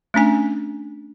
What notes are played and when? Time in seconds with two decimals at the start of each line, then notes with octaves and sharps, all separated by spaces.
0.14 A3 C#4 D4 G#5